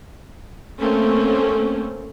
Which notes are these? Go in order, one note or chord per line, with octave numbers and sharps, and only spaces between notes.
A3 A#3 C4 C#4 A4